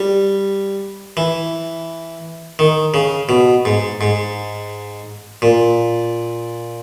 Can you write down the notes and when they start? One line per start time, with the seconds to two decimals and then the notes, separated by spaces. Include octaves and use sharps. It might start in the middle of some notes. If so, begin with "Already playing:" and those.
Already playing: G3
1.17 E3
2.59 D#3
2.94 C#3
3.29 B2
3.65 G#2
4.01 G#2
5.42 A#2